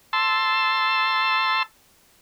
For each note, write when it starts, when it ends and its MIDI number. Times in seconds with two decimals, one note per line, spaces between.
0.13 1.63 81
0.13 1.63 84
0.13 1.63 88